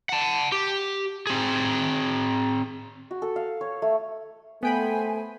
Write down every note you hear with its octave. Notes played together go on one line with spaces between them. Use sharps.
F#5 A5
G4
C4 G#4
F#4
A4
F5
C#5
A3
A3 B3 C5 G5 G#5 B5